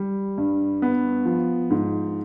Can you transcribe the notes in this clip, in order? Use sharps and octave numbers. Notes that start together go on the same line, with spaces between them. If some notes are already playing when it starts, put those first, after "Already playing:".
Already playing: G3
G2
B3
F3
G#2